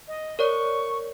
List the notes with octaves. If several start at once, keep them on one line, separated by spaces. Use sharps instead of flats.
D#5
A#4 C#5 D5 C#6